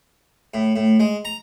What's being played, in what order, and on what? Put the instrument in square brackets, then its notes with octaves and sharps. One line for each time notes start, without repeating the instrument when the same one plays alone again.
[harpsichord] A2
A2
G#3
A#5